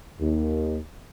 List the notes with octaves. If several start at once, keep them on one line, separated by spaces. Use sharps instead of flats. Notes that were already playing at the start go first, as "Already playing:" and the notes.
D#2